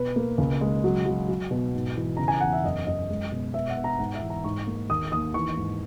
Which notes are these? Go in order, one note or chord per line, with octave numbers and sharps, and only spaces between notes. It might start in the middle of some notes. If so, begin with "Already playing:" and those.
Already playing: B2 B4
A#3
C#2
G#3
F#3
F#3
F#3
B2
G#2
E3
C#3 A#5
G#5
E2 F#5
E5
F#2 D#5
F#2 D#5
G#3
B2
B3 E5
F#5
B3
A#5
G#2 F#5
E5
E3
A#5
G#2 C#6
A#3
D#2 D#6
D#2 D#6
E3 C#6
G#2